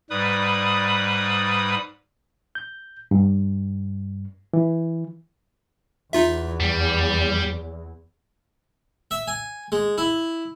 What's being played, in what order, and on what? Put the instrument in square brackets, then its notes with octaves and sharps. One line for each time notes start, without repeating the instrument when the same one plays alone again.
[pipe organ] G#2 G3 B4 B5 D#6
[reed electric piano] G6
G2
E3
[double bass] E2 [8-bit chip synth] D#4 F4 E5
[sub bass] F2 [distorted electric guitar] G3
[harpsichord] E5
G#5
G#3
E4